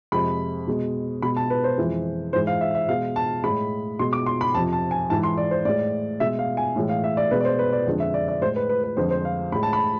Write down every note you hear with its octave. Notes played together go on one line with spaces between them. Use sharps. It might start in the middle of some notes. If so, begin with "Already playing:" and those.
F2 C3 G#3 B5
B2 G#3
B2 G#3 B5
A5
B4
C5
F2 E3 G#3
G#2 E3 G#3 C5
F5
E5
E5
B2 G#3 F5
A5
A2 G#3 B5
B2 G#3 C6
D6
C6
B5
F2 C3 F3 A5
A5
G#5
G#2 E3 G#3 A5
C6
D5
C5
A2 G#3 D5
B2 G#3 E5
F5
G#5
A2 E3 G#3
F5
E5
D5
B2 G#3 B4
D5
C5
B4
D5
F2 D3 G#3
E5
D5
D5
A2 G#3 C5
B4
B4
B4
F2 D3 F3 G#3 C5
C5
F5
A2 G#3 B5
A5
B5